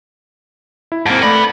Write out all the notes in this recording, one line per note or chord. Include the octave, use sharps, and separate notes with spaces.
E4
G#2 A#3 C4 A5
A3 B3 D5 B5 A#6